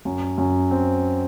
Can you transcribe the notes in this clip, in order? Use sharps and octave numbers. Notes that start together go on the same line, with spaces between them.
F#2
F#2
C4